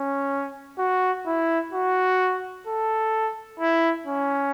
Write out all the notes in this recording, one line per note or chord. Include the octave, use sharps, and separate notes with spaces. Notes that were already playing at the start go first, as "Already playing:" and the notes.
Already playing: C#4
F#4
E4
F#4
A4
E4
C#4